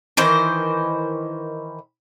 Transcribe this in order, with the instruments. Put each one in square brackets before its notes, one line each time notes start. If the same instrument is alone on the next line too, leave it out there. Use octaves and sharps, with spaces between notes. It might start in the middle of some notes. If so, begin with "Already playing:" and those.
[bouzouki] D#3 E3 C5 D#5